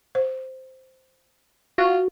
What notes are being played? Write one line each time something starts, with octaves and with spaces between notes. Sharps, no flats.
C5
F4 F#4